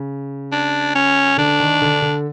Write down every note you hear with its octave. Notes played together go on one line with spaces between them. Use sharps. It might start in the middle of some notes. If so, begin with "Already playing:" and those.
Already playing: C#3
D4
C#4
D3 D4
D#3
D3
D3